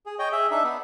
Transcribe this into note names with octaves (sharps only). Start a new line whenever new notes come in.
G#4
C#5 D#5 G5
G#4 E5
D4 D#4 E5
B3